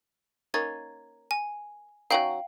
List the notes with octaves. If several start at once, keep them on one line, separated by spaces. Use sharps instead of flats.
A#3 C#4 D#4 G#6 A6
G#5
F#3 C#4 D#4 F5 G5 F#7